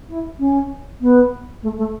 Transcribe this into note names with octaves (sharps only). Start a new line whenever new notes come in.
E4
C#4
B3
A3
A3